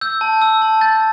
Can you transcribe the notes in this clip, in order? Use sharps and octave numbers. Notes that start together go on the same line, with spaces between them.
E6 G6
A5
E6
A5
G6 A6